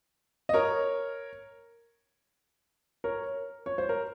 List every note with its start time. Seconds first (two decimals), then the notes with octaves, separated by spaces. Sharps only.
0.49 D#5
0.54 A#4 C#5
3.04 A#4 C#5
3.66 C#5
3.78 C5
3.89 A#4